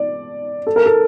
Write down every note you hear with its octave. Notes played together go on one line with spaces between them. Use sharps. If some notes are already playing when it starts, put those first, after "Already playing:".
Already playing: D5
A4
A#4
A4